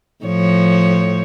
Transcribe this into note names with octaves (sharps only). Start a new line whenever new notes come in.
A2 F3 C#5